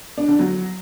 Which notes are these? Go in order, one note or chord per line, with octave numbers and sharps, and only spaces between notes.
D4
D3
F#3